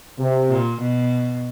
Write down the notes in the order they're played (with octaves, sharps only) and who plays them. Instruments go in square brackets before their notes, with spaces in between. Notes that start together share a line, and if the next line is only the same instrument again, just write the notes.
[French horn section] C3
[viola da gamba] A#2
B2